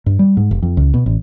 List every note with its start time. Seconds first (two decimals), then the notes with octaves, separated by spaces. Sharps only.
0.06 G2
0.19 G3
0.37 G#2
0.51 F1
0.62 F2
0.77 C#2
0.94 B2
1.06 A1